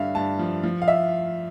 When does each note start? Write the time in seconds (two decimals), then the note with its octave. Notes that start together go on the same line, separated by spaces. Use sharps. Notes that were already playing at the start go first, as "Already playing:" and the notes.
Already playing: G2 D3 E5 F5
0.15 G2 A5
0.39 F3
0.63 F3
0.82 F5
0.88 E5